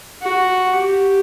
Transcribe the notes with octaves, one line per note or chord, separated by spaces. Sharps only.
F#4
G4